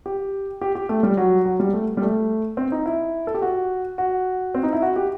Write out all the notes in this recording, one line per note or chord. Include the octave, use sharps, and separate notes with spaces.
G4
G4
G4
A3
G3
F#3
F#3
G3
A3
G3
A3
C4
D#4
E4
A4
G4
F#4
F#4
C4
D#4
E4
F#4
G4